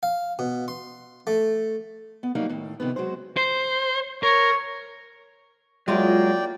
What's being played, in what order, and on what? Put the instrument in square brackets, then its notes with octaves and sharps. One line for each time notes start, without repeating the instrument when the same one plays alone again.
[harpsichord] F5
B2
C6
A3
[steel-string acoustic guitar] B3
D2 F#3 G3 A#3 D#4 F5
A2 D#3
F2 C3 D#3 B3
F#3 G#3 F#4 C5
[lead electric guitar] C5
[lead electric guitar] A#4 [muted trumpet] C#5
[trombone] F#3 [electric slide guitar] G#3 [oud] A#3 E4 F4 [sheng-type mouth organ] D5 G5